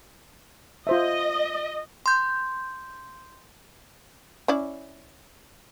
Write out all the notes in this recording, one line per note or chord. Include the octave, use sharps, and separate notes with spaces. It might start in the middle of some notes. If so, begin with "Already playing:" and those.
F4 C5 D#5 E5
C6 G6
C#4 E4 D5